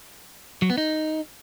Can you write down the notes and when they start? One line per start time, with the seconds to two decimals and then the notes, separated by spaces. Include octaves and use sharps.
0.62 F#3
0.70 B3
0.78 D#4